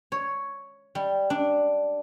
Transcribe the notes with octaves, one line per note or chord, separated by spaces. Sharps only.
C#5
G3
D4